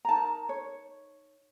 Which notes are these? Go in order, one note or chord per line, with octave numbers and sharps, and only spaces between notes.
A#5
D#4 A#4 A5
C#5